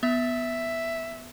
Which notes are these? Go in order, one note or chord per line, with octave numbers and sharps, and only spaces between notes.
B3 E5